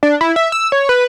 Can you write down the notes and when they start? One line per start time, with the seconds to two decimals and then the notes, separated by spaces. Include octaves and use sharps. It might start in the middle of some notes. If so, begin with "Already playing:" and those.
0.03 D4
0.21 E4
0.36 E5
0.52 E6
0.72 C#5
0.89 B4